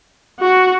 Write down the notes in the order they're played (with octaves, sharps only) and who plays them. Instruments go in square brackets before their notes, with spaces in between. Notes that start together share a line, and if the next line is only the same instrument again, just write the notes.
[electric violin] F#4